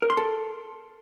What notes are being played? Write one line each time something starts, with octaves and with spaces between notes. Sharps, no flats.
A#4
C6
A4